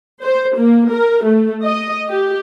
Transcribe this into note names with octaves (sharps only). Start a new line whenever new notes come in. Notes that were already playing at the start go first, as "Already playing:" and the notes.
C5
A#3
A#4
A3
D#5
G4